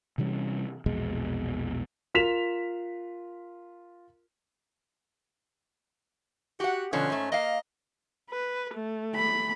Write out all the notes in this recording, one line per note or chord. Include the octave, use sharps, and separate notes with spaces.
C3 E3 G3 C#4
A#1 E2 B2 G#3
F4 A#4 B6 E7 F7
F#4 G4 F#5
B2 D3 F3 C#4
G#2 A3
A#3 D#5 F5
B4
A3
B5